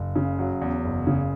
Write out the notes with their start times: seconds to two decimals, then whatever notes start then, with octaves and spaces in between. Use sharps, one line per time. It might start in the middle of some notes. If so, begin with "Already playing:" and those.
Already playing: F#1
0.16 C#3
0.39 F#3
0.61 E2
0.84 F#1
1.07 C#3